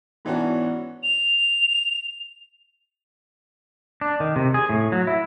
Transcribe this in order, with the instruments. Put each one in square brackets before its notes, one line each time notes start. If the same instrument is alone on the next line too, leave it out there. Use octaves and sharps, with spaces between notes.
[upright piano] G#2 E3 B3 C#4 D4 F#4
[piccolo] F7
[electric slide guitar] D4
D#3
C3
G#4
A2
F#3
E4